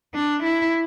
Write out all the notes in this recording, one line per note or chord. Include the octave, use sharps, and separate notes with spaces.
D4
E4